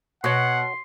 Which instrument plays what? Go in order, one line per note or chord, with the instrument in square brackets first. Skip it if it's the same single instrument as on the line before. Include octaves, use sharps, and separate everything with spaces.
[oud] B2 [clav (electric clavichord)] F#4 C#5 [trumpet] F#5 [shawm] C6